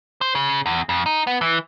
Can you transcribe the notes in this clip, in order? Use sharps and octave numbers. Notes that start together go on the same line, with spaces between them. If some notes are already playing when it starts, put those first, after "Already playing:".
C5
C#3
E2
F2
D#4
B3
E3